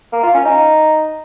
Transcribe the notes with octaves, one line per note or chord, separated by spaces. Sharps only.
A#3
F4
C#4
D#4